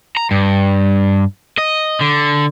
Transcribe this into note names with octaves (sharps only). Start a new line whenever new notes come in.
A#5
G2
D#5
D3